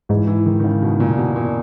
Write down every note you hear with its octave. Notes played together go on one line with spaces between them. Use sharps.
G#2 E3
E3
D#3
D#3
C#3
B2
A#2
B2
A#2